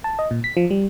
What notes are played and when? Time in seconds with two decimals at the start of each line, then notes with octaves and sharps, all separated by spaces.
0.04 A5
0.19 D#5
0.31 A#2
0.44 B6
0.57 F3
0.71 G3